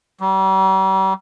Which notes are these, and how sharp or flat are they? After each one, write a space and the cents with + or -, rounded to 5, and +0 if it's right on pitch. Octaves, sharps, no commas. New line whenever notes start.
G3 -40